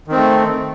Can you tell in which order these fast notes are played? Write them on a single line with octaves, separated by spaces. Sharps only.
D#3 C4 A3